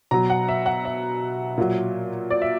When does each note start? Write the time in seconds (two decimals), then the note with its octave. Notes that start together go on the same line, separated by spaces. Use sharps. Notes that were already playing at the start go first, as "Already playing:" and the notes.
0.11 B2 F#3 A#5
0.30 F#5
0.48 E5
0.66 F#5
0.85 E5
1.58 A#2 F#3
2.31 D5
2.42 E5